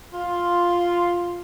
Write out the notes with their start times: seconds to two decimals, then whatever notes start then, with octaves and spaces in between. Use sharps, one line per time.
0.14 F4